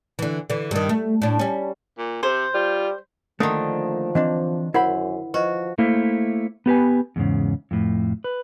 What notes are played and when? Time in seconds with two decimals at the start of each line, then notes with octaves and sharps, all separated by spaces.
0.19 D3 E3
0.50 D3 E3
0.71 G2 D#3
0.89 A3
1.22 A2 D4
1.39 G3 C#4
1.98 A#2
2.23 C3 C5
2.54 G3 F4
3.40 D3 D#3 F3 A3 A#3 D4 D#6
4.15 E3 C4 D4 D#5
4.74 F#2 E4 A#4 C5 F#5 B5
5.34 F3 F#4 B4 D#5
5.78 A3 A#3 E4 C5 F5
6.66 B3 G4 B4 G#5
7.16 E2 G#2 C#3
7.71 F2 A2
8.24 B4